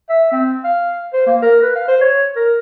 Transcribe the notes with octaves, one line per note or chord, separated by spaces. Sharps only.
E5
C4
F5
C5
A#3
A#4
B4
F5
C5
C#5
A#4